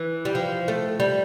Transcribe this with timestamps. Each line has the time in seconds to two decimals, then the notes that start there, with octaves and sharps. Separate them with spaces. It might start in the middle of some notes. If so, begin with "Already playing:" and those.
Already playing: E3
0.25 G3
0.35 F3
0.68 A3
1.00 G3